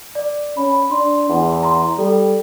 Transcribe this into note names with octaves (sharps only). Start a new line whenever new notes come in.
D5
C#4 B5
D4 C6
E2
A#5 C6
G3 A4